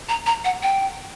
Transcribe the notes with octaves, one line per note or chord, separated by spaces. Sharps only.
A#5
A#5
F#5
G5